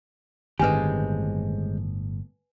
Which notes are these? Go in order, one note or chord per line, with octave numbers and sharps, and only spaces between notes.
G1 A2 D#3 G#3 C4 G4 B4 G#5